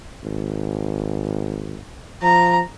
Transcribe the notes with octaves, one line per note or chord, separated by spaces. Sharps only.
G#1
F3 A#5